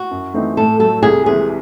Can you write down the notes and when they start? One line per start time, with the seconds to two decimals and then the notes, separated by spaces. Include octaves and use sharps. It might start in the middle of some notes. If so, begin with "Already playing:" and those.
Already playing: F#4
0.11 F#2
0.34 E3 A3 C4 D#4
0.57 A2 A4
0.79 F#3 A3 A4
1.03 C2 G#4
1.26 C3 E3 G#3 G#4